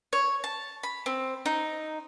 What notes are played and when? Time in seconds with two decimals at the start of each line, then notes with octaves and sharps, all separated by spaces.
0.13 C#5
0.44 A5
0.83 B5
1.06 C4
1.46 D#4